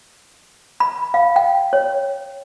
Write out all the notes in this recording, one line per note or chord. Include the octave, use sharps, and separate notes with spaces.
B5
F5
G5
C#5